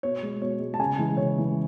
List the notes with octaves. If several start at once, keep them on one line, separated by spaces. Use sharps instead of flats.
B2 C#5
G#3
B2 C#5
G#3
A5
C#3 G#5
E3 G#3
C#3 C#5
E3 G#3